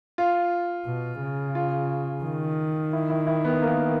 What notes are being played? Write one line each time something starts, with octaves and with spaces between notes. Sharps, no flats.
F4
B2
C#3
F4
D#3
E4
E4
E4
B3
A#3